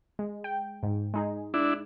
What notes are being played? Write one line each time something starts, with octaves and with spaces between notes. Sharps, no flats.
G#3
G5
G#2
G#3 D#4 G#4
D4 E4